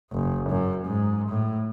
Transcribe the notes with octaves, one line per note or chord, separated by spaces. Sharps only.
F#1
F#2
G#2
A2